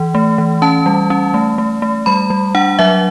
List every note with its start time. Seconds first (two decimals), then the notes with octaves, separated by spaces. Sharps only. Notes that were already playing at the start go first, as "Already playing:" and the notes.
Already playing: E3
0.15 A3
0.38 E3
0.62 C#4 A5
0.86 G3
1.10 C#4
1.34 A3
1.58 A3
1.82 A3
2.06 G3 B5
2.30 G3
2.55 D4 F#5
2.79 F#3 E5